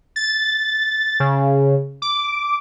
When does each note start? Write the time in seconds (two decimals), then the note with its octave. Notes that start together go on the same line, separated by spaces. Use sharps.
0.16 A6
1.20 C#3
2.02 D6